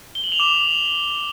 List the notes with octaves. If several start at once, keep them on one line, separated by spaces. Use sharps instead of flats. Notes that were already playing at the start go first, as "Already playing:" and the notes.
G7
F#7
F7
D6 E7